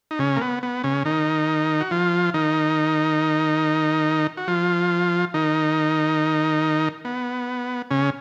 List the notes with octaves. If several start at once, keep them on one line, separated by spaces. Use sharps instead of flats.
D#4
C#3 C#4
A#3
B3
B3
C#3 C#4
D#3 D#4
F#4
F3 F4
D#3 D#4
F#4
F3 F4
D#3 D#4
B3
C#3 C#4